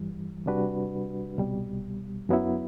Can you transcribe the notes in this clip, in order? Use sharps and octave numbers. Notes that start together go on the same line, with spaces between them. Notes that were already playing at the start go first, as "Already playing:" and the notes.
Already playing: G2 E3 G3
C3 G3 D4 F#4 B4
C2 B2 G3
F#2 F#3 B3 E4